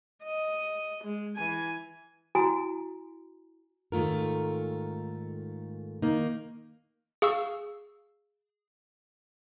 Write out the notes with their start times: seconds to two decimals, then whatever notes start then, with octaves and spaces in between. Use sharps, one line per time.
0.23 D#5
1.03 G#3
1.36 E3 G#5
2.35 E4 F#4 G#5 A#5
3.92 G#2 D#3 A3 F4 A#4
6.02 D#3 A#3 D#4
7.22 G#4 F5 C#6 E6